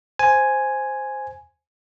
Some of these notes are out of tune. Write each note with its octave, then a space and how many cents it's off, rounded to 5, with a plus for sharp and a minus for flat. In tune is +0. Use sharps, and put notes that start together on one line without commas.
C5 +0 G#5 +0